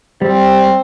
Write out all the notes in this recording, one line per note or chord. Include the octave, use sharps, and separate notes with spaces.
G3 C4